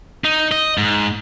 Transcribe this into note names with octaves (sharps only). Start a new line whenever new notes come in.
D#4
D#5
G#2